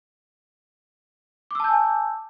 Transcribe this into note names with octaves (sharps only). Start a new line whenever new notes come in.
G#5 A5 D6 E6 G6